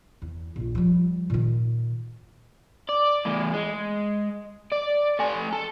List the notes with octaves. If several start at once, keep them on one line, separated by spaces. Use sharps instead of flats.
E2
A#1 F4
F3 G3
A#2 D#3
D5
E2 A2
G#3
D5
A3 G#5
A4